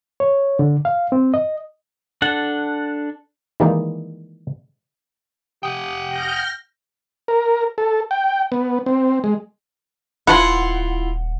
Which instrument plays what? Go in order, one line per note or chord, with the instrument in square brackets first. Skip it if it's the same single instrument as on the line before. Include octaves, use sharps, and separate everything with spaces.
[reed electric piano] C#5
D3
F5
C4
D#5
[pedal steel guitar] D4 A4 F#5
[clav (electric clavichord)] D#3 E3 G3 G#3 A#3 D#4
[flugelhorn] G4 [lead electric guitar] F#5 G5 [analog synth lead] D#6
[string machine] F6 G6 A#6
[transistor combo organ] A#4
A4
G5
B3
C4
G#3
[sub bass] D#1 [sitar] E4 F4 [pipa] B4 A5 C6 [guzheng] F#5